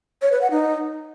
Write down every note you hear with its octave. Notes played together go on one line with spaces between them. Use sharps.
C#5
B4
F#5
D#4